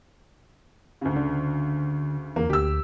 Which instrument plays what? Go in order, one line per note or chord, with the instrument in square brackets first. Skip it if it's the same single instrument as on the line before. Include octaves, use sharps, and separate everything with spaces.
[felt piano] D2 C#3
[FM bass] D3
[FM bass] E2 [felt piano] A#3
[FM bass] D2 [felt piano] G4 E6